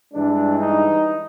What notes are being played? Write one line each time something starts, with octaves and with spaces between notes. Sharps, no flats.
G2 E3 G#3 D4
D#4